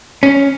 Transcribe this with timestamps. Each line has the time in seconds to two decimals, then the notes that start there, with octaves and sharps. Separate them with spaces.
0.23 C#4